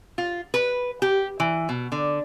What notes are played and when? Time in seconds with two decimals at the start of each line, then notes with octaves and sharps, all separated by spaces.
0.18 F4
0.54 B4
1.02 G4
1.40 E3
1.69 B2
1.92 D3